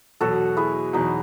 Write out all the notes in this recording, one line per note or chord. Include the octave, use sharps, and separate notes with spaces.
E2 B2 F#3 F#4 A4
E4 G#4
E2 B2 F#3 D#4 F#4